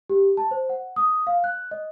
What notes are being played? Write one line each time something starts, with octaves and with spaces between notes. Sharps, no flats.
G4
A5
C5
F#5
D#6
F5
F#6
D#5